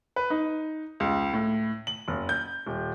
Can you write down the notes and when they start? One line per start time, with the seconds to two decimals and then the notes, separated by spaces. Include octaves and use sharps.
0.16 B4
0.30 D#4
1.00 C#2
1.33 A2
1.87 F#7
2.08 F#1
2.29 G6
2.66 D#1